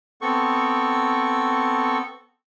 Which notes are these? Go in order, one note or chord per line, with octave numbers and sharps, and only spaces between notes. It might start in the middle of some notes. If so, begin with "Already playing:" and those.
B3 C4 A4 C#6